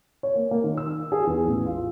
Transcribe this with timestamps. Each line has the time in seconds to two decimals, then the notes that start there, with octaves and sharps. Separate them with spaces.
0.23 C#5
0.36 A#3
0.51 A#3
0.64 D#3
0.77 E6
1.12 G#4
1.27 E2
1.48 A1
1.66 F4